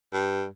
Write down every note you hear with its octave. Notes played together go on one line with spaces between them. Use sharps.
G2